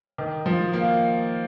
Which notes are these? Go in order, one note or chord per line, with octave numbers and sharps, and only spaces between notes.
D#3
F3
A#3